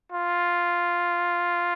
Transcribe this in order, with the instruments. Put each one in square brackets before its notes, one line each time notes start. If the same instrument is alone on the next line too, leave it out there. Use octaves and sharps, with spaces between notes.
[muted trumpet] F4